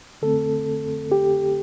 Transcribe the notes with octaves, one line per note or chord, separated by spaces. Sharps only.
D3 A3 C4 A4
G4